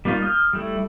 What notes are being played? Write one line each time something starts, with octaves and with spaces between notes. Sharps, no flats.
G3 A#3 D#4 F4
D#6 F6 G6
G3 A3 E4